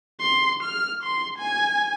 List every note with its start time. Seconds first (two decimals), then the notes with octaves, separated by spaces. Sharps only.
0.20 C6
0.63 F6
1.03 C6
1.38 G#5